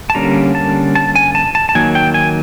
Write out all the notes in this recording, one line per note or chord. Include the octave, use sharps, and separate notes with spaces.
A5
D3 G3 A#3 C#4 A#5
A5
A5
G#5
A5
A5
A5
D#3 F#3 A#3 G#5
G5
G#5